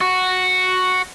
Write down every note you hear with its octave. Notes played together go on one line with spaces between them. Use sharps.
F#4